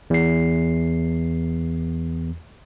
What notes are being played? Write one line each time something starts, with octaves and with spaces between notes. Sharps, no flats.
E2 C7